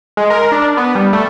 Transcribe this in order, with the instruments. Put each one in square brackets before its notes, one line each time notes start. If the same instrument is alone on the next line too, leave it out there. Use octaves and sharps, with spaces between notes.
[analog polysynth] G#3
A#4
D4
B3
G3
A3